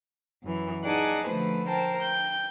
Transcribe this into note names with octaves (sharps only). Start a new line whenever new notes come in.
F#2 E3
D#4 G#4 D5 F#5 G#5 A5
D3 F3 A3 B4 C5
A#4 C5 G5 A5
G5 G6